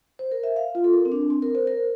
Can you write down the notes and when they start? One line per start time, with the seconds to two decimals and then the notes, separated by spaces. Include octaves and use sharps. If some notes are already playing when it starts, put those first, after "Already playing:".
0.19 C5
0.32 A#4
0.43 E5
0.56 F5
0.75 F4
0.84 A4
0.93 A#4
1.05 C4
1.12 D4
1.30 C4
1.42 A#4
1.55 C5
1.67 A#4